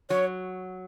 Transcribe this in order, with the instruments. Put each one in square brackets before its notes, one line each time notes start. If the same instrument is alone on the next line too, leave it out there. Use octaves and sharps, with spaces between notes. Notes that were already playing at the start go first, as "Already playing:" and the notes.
[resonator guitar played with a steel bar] F#3 [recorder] C#5